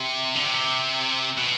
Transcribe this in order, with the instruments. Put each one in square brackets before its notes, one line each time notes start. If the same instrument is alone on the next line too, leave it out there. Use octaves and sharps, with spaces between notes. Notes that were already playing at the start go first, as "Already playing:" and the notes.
Already playing: [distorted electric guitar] C3
D3
C3
B2